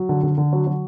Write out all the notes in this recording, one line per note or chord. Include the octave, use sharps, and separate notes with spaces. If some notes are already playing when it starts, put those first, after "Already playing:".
Already playing: F#3
D3
D3
D3
F#3
F#3